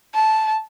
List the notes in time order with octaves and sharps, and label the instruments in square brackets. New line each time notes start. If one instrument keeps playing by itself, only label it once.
[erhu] A5